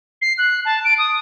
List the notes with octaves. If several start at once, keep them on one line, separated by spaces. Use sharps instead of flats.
C7
F#6
A5
D7
D#6